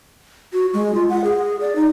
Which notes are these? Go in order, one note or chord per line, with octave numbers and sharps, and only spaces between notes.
F#4
G#3
F4
F#5
G#4
D5
D#4